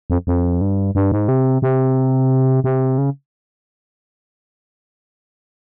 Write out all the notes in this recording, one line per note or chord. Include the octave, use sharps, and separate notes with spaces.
F2
F2
G2
G2
G#2
C3
C3
C3
C#3